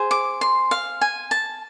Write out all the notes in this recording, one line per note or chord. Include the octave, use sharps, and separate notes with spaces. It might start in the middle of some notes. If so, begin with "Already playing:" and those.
Already playing: G#4 C5
D6
C6
F5
G#5
A5